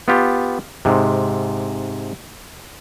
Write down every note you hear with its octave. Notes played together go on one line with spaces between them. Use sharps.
B3 F4 G4
G#2 C3